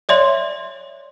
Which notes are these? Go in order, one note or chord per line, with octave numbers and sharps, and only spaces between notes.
C#5 D5 E5 C6